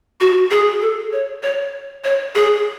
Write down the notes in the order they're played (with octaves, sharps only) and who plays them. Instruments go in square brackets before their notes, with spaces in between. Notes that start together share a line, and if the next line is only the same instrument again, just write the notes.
[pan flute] F#4
G#4
A4
C#5
C#5
C#5
G#4